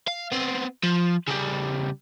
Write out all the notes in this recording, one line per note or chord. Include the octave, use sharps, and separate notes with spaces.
F5
B3 C4
F3
C#3 G3